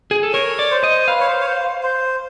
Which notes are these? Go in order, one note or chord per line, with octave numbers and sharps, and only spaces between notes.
G#4
A4
A#4 C#5
D5
C5
D#5
B4 F5
C#5
C5
C#5
C5
C5